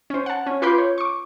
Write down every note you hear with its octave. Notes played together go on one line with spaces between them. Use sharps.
C#4 C5
F#5 A5
C#4
F4 B4 B5 C6 D6 G6
C#5
C#6 D6